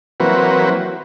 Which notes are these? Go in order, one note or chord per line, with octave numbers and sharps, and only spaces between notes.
E3 F#3 A#3 C4 F#4 B4